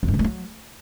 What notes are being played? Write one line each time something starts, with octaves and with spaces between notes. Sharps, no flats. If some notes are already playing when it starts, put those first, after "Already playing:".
E2
G2
D3
G#3
F#3